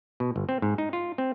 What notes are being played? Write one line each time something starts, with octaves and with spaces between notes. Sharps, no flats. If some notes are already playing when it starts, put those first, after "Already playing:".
B2
G1
C4
G#2
D#4
F4
C4